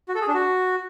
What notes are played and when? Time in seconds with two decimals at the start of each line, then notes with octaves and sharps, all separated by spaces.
0.09 F#4
0.15 A4
0.21 G#4
0.28 D4
0.34 F#4